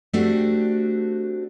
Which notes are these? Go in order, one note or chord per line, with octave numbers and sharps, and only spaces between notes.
A3 C4 D4 F#4 G4